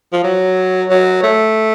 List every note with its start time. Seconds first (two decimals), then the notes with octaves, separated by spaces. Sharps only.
0.12 F3
0.23 F#3
0.89 F#3
1.23 A3